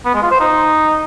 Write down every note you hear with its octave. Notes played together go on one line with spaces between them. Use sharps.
B3
G#3
F4
C5
D#4